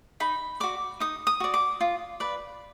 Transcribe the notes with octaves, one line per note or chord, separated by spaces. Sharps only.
D#4 B5
F#4 D5 D6
D#4 D#6
D#6
F#4 D5
D6
F4
B4 D5